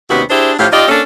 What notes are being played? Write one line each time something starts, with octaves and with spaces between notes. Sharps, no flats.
D#2 C3 B3 C#4 F#4
D4 E4 G4 G#4 C5
A2 F3 C#4 G4 F5
D#4 F4 G4 D5 D#5
A#3 C#4 D4 A4